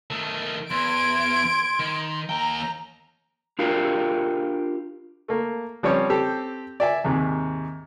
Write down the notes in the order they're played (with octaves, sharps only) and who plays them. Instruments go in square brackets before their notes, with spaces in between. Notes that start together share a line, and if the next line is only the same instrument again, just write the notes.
[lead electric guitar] D#3 A3
[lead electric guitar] E2 [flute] C6 [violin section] G#6 D7
[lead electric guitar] D#3
[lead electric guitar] D#2 G5 [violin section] A#5
[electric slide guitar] D4 F4 G4 A#4 F5
[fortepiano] A3 A#3
F3 G3 C4 C#4 C#5
C4 G4 A4
D5 E5 G#5
D#2 G#2 C3